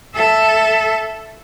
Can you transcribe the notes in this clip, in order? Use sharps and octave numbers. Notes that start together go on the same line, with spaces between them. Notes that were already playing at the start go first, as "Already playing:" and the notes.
A4 E5